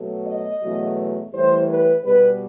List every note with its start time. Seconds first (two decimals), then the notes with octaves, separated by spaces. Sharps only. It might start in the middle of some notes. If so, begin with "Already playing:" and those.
Already playing: B2 F#3 A3
0.28 D#5
0.62 E2 B2 F#3 A3
1.33 A2 E3 G3 C5
1.69 B4
2.03 B2 G3 B4